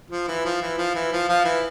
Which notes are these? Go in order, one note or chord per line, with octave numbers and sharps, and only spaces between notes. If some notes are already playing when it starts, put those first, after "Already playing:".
F3
E3
F3
E3
F3
E3
F3
F3
E3